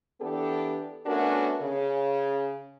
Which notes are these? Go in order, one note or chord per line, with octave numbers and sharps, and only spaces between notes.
E3 B3 D4 G4 A4
A3 B3 C#4 D4 F#4 A#4
C#3